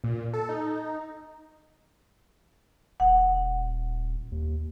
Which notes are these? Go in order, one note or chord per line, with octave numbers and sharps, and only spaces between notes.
A#2
A4
D#4
D#1 F#5
D#2